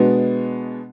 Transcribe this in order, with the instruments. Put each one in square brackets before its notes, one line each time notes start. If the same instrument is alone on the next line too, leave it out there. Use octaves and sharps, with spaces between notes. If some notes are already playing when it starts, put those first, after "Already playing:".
Already playing: [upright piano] B2 G#3 B3 D4